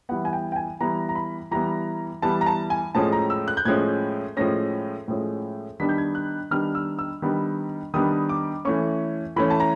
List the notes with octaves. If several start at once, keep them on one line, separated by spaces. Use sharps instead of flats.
E3 G3 B3 F#5
G#5
G5
G5
G#5
E3 G3 B3 A#5
A#5
B5
E3 G3 B3 A#5
E3 G3 B3 A5
A#5
A5
G#5
A2 F3 G#3 C#4 A5
A#5
E6
F#6
G6
A2 F3 G#3 C#4 G#6
A2 F3 G#3 C#4 A#6
A2 F3 G#3 C#4
D#3 G3 B3 D4 B6
G6
G#6
F#6
D#3 G3 B3 D4 F6
E6
E6
D#3 G3 B3 D4
D#3 G3 B3 D4 D#6
D6
E3 A3 C#4 C#6
E3 A3 C#4 B5
A5
A#5